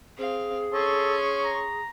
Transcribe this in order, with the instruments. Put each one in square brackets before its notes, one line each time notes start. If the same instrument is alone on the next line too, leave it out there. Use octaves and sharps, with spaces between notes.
[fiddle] C4 F5 [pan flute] G#4
[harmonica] C#4 [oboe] A4 [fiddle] C6 C#6
[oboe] A#5